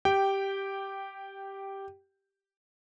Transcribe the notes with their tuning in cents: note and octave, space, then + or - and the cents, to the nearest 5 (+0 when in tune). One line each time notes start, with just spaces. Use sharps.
G4 +0 G5 -10